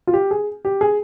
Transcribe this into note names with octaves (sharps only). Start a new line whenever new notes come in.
F4
G4
G#4
G4
G#4